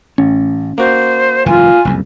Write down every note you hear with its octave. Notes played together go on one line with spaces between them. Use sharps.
A1 C#4
A#3 F#4 C5
F#1 G#2 E3 F4 G#5
F#1 C2 F2